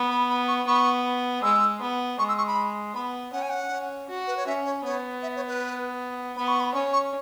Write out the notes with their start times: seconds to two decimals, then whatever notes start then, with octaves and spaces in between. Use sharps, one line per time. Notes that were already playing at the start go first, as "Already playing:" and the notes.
Already playing: B3
0.10 B5
0.30 B5
0.48 C#6
0.67 B3 C#6
1.43 G#3 E6
1.81 B3
2.19 G#3 C#6
2.29 E6
2.38 C#6
2.47 B5
2.95 B3 B5
3.33 C#4 F#5
3.42 G#5
3.50 F#5
3.71 C#4
4.09 F#4
4.27 B4
4.37 C#5
4.47 C#4 E5
4.65 C#5
4.85 B3 C#5
5.23 E5
5.36 C#5
5.48 B4
6.37 B3 B5
6.48 C#6
6.60 B5
6.74 C#4 C#6
6.93 C#6